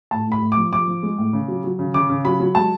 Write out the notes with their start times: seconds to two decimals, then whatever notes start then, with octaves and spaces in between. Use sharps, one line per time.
0.11 A2 A5
0.27 A2 B5
0.42 A2
0.52 D6
0.57 F3
0.72 F3 D6
0.88 F3
1.03 G#3
1.18 A2
1.33 C#3
1.48 F#3
1.64 F#3
1.79 C#3
1.94 C#3 D6
2.09 C#3
2.25 F#3 B5
2.40 F#3
2.55 G#3 A5